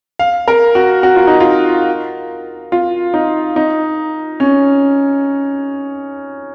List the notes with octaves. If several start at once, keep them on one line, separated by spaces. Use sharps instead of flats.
F5
A#4
F#4
F#4
F4
D#4
F4
F4
D#4
D#4
C#4